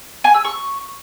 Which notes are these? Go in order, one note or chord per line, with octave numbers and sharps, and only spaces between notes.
G#5
E6
C#6